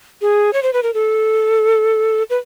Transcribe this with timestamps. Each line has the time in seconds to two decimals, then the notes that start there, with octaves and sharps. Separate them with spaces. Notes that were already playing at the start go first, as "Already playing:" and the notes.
0.21 G#4
0.53 C#5
0.63 C5
0.73 B4
0.83 A#4
0.94 A4
2.30 B4